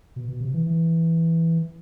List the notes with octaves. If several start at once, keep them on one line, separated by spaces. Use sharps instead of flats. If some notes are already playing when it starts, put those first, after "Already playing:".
B2
B2
C3
E3
E3